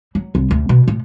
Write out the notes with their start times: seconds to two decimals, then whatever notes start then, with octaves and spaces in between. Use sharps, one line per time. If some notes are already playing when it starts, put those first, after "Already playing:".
0.15 F#3
0.35 C2
0.51 D2
0.69 B2
0.88 A2